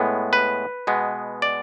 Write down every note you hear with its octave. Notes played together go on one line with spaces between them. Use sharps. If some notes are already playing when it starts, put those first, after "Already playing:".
Already playing: A2 G#3 B3
B4
B2 G#3 B3
D5